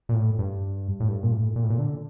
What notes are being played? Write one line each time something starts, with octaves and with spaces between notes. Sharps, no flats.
A#2
A2
G2
A2
G2
A#2
A2
A#2
A2
A#2
D3